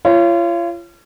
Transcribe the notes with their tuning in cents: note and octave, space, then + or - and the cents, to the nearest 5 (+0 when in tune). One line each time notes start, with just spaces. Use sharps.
F4 -35 C#5 +0